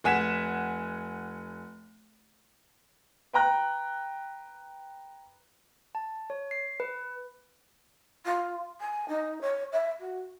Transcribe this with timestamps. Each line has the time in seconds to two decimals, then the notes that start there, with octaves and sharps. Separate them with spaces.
0.04 F1 F#5 G#5 B6 E7
3.33 B4 G5 A#5 F#6
5.95 A5
6.30 C#5
6.51 C7
6.80 B4
8.25 F4
8.81 G#5
9.08 D#4
9.41 C#5
9.72 E5
10.00 F#4